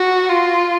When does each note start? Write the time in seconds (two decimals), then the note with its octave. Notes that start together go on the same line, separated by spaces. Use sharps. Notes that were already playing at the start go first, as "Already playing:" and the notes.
Already playing: F#4
0.29 F4